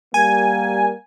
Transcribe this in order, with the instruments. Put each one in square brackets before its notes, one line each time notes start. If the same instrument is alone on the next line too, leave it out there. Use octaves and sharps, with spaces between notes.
[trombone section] G3 A#3 [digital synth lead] G#5